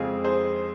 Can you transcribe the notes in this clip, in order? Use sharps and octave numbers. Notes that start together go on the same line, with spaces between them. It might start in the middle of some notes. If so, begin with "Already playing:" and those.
Already playing: F2 C#3 G#3 C4 F4 G#4
G#4 C5